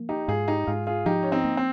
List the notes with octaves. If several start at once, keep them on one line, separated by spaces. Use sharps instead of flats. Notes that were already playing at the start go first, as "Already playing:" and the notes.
Already playing: F3 A#3
D#4 G4
G#2 F4 G#4
D#4 G4
G#2 F4 G#4
F4 G#4
F3 D#4 G4
C#4
C4 D#4
A#3
C4